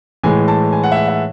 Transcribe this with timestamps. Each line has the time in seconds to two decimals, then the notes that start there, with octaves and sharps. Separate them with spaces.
0.23 A2 E3 G#3 G#5
0.48 A5
0.72 G#5
0.83 F#5
0.92 E5
0.96 F#5
1.08 E5